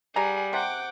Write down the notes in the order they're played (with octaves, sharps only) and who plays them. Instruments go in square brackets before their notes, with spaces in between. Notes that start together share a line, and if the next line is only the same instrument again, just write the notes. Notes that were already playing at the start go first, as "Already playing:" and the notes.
[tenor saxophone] G3 [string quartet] G#4 F#5 [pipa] A#5
[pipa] C3 [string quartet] F#5 G5 D6